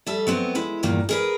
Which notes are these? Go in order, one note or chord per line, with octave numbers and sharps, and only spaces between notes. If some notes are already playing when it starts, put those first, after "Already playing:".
G3 A4 E5
F#3 B3 C4
G#3 E4
E2 G2 A#2 D#3 A#3
G#4 A#4 B4